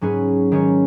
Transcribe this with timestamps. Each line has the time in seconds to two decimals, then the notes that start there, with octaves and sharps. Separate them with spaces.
0.01 G#2 F#3 C#4 G#4 B4
0.51 D#3 G#3 C#4 G#4 C#5